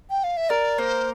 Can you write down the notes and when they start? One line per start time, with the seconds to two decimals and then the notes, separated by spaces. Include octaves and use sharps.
0.10 G5
0.24 F5
0.37 E5
0.49 A#4 D5
0.78 A#3 C5